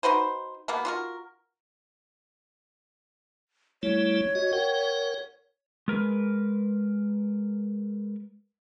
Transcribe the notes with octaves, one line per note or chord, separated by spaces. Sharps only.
D#4 F#4 B4 C5
B2 A#3 B3
F4 F#4 A#4
G3 A3 E4 C#5
F#4 D#5
A#4 F#5 G5
G#3 A#4 B4